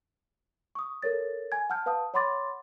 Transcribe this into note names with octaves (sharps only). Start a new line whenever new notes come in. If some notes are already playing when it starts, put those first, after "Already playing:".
C#6 D#6
A4 A#4 C#5 A6
G#5 G#6
F#5 A5 F6 G6
B4 F5 A5 D#6
C#5 F#5 B5 C6 D6 A6